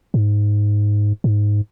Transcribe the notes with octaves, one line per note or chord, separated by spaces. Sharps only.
G#2
G#2